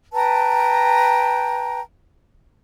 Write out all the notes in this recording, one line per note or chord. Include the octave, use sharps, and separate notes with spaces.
B4 G5 A5 A#5